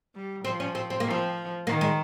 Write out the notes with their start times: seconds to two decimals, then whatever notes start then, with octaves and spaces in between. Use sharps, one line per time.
0.15 G3
0.45 F3 C4
0.60 C#4
0.75 C4
0.90 C4
1.00 A#3
1.06 F3 C4
1.67 D#3 A#3
1.81 G#3